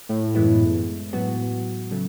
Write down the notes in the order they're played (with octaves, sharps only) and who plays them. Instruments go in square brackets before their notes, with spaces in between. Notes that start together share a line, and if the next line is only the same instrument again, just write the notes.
[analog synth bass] A2
[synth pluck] F#2 E3 G#3 B3 E4
A2 F#3 B3 F#4
C#3 F#3 A3